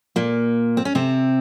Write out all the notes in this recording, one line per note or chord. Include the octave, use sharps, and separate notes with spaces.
A#2 A#3
C4
C#4
C3 C4